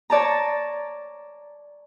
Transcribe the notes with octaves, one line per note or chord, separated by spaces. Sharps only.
C#5 D5 A5 A#5